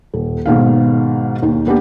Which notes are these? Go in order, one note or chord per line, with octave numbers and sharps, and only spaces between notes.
D#1
G#2 B2 D#3 F5
D#2 D#3
A#3 B3 D4 G4